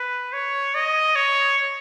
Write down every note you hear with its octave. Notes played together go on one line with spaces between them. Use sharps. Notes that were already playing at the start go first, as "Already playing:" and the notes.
Already playing: B4
C#5
D#5
C#5